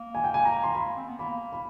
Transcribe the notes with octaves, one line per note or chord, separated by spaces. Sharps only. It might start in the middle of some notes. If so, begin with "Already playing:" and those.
Already playing: A#3
G#5
G5
G#5
A#5
C6
A#3 B5
C4
B3
A#3 B5
B5